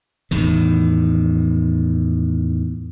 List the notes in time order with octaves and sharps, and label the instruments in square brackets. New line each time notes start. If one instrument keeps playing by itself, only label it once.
[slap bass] E2 A2 D#3